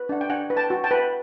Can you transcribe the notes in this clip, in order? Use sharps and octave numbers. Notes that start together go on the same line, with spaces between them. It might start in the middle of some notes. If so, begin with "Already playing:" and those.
Already playing: B4
D4 F#5
G5
D4 F#5 G#5
B4
G5 A5
F#4
G5 A5
B4